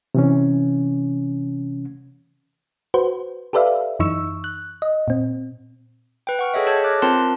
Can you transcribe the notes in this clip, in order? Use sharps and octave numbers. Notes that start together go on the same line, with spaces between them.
C3 E3 C#4
F#4 B4 C5
G4 A4 B4 D5 E5 F5
F#2 E3 D#4 C#6 E6
F#6
D#5
A#2 C4
B4 G5
F#5 C#6 F6
G#4 A4 C#5 D#5 E5
G#4 A4 C#5 A5 G6 G#6
D6 F6 F#6 A6 A#6
C4 F4 A#4 C5 A5 C6